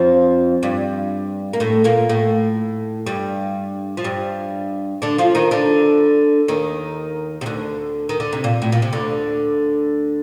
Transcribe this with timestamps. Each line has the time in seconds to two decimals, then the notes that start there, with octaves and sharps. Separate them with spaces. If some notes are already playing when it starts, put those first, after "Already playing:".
Already playing: F2 F3
0.63 G2 G3
1.53 A#3
1.60 A2 A3
1.84 A#2 A#3
2.09 A2 A3
3.06 G2 G3
3.97 F3
4.04 G2 G3
5.02 D3 D4
5.18 F3 F4
5.35 D#3 D#4
5.51 D3 D4
6.48 D#2 D#3
7.41 C3
7.46 D2 D3
8.09 D#3
8.20 D3
8.33 C3
8.44 A#2
8.62 A2
8.72 A#2
8.82 C3
8.93 D2 D3